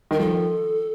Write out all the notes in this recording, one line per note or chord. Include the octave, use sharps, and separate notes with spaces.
D#3 A#4
F3 A4